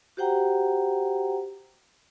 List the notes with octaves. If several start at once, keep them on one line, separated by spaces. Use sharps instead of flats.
F#4 G4 C5 F#5 G5 A#5